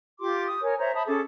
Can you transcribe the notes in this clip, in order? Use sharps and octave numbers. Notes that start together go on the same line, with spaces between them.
F4 G4 C6 D6
D#6
A#4 C#5 G#5
C5 C#5 E5 A#5
E5 A5 B5 D#6
C#4 G#4 A4 D6